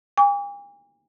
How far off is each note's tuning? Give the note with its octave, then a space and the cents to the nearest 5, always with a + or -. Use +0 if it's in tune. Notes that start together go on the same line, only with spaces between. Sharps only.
G#5 -45 D6 -45